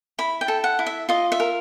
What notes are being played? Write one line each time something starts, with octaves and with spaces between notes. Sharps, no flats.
E4 B5
G5
A4
F#5
E4
E5
F4 D#5
E5
A#4